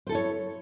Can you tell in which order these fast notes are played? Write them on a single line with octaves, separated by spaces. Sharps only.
C5 A4 E4 C#5